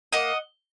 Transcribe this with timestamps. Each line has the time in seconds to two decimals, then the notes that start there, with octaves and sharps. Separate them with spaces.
0.13 A#3 D#5 F#5